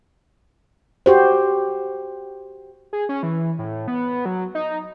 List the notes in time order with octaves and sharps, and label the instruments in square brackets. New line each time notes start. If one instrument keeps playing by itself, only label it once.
[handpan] F#4 G4 C5
[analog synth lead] G#4
C#4
E3
A2
B3
F#3
D#4